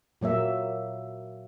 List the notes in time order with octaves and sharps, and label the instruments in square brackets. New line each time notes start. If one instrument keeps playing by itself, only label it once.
[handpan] A#2 F#3 A#3 E5